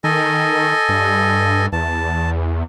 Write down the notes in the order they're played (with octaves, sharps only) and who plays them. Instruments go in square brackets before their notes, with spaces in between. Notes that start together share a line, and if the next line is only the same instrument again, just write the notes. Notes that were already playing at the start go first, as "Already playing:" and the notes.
[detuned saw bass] D#3 [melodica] A4 D#5 G#5
[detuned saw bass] G2
[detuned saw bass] E2 [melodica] A5